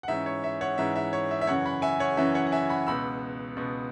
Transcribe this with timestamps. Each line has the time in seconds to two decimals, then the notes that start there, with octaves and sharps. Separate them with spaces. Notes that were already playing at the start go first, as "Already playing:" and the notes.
0.03 F#5
0.08 G#2 E3 C#4 E5
0.26 C#5
0.44 E5
0.61 C#5 F#5
0.78 G#2 E3 C#4 E5
0.95 E5
1.13 C#5
1.31 E5
1.41 E5
1.47 F#2 C#3 E3 C#5 F#5
1.66 F#5 B5
1.82 E5 G#5
2.00 C#5 F#5
2.17 F#2 C#3 E3 E5
2.34 C#5 F#5
2.47 F#5
2.52 E5 G#5
2.69 F#5 B5
2.87 C#2 B2 B3 B5 E6
3.56 C#2 B2 B3